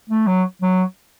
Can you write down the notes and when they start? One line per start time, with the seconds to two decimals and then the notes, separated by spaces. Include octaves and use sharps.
0.10 A3
0.27 F#3
0.62 F#3